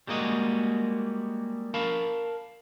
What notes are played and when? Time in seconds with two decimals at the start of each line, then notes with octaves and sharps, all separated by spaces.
0.07 G3 G#3 A#3 F#4 D#5
1.74 A#4 F5 A5 B5